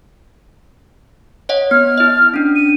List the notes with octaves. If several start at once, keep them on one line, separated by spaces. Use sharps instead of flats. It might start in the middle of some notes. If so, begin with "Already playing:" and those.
C#5 D#5 F#5
B3 F6
E4 D#5
C#4 D4
D#7